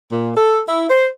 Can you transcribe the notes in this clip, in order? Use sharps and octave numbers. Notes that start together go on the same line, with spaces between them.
A#2
A4
E4
C5